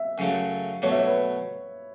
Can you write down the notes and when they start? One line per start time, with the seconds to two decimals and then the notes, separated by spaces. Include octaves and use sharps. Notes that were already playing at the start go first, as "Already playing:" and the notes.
Already playing: E5
0.18 F#2 C#3 F#3 A3
0.82 B2 F#3 A3 C#5
0.91 E5
0.99 C#5
1.07 B4